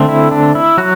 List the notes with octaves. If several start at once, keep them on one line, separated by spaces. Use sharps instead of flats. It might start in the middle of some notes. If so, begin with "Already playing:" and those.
Already playing: D3 A3 C4
E4
D4
E4
F#3 F#4